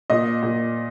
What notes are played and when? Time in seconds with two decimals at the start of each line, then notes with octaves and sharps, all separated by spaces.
0.10 A#2 D#5
0.42 A#2